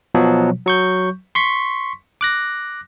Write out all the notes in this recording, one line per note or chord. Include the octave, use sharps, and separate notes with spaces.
B2 F3 F#3
F#3 C#6 G6
C6 C#6 B6
D6 F#6 A#6